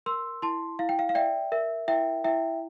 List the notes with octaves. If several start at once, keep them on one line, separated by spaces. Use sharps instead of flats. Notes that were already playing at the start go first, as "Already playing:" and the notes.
A#4 C6 E6
E4 A5 C6
E4 F5
G5
F5
F5
D5 E5 G5
A#4 E5
E4 E5 G5
E4 E5 G5